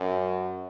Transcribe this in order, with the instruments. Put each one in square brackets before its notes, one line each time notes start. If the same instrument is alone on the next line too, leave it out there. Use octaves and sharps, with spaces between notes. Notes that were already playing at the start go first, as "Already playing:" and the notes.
Already playing: [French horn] F#2